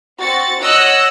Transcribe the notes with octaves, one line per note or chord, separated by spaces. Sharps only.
C4 F#4 A6 C#7
C#5 D#5 F#5 E6 F#6